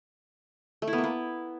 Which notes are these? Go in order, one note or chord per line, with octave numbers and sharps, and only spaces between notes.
A3
E4
B3
A#3
B3